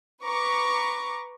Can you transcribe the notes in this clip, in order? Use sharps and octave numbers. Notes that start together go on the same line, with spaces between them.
B4 A#5 C#6 D6